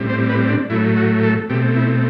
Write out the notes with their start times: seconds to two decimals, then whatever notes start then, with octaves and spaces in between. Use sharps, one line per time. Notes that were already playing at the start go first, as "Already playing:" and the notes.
Already playing: A2 G3 C4
0.09 C5
0.29 B4
0.50 D4
0.70 A2 F#3 A3 E4
0.96 F#4
1.23 A4
1.49 B2 A3 C4 G4
1.76 E4